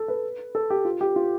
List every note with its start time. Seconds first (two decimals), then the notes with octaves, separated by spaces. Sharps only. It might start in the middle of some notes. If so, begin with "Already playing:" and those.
Already playing: A4
0.08 B4
0.55 A4
0.70 G4
0.85 F4
1.01 G4
1.16 F4